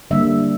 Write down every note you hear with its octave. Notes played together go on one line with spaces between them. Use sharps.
D3 G3 A#3 E5